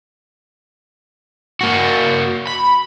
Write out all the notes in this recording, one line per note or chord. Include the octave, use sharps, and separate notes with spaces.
A#3 F#4
B5